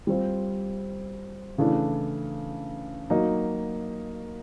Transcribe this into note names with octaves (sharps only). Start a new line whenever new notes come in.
G3 C4 F4
C#3 E3 A3 D4
F#3 A#3 D#4